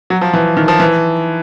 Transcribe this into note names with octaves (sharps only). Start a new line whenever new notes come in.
F#3
F3
E3
D#3
F3
E3